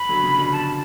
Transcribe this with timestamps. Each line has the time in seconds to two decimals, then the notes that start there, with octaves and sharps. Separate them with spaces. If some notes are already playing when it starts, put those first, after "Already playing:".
Already playing: B5
0.09 D3 F#3
0.24 C#3 F3
0.38 B2 D3
0.52 A5